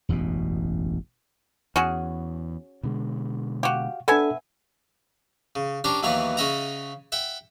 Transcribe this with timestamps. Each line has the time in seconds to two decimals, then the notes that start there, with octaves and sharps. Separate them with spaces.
0.09 E1 A1 F#2 B2
1.76 E2 C#4 F#4 G#4
2.83 B2 D3 G#3
3.63 F#4 G4 F5
4.08 B3 D4 A4 E5 G#5
5.55 C#3
5.84 C#4 D4 G4 A#4 C5
6.03 D#2 E3 F#3 B3 C#5 F5
6.37 C#3 C#4 D#5 E5 F#5 A#5
7.12 E5 F#5 G5